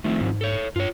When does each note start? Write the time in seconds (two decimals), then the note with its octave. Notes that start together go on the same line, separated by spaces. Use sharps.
0.04 D#3 F3 A3 C4
0.21 G#2
0.41 A4 C#5
0.76 G2 F4 C#5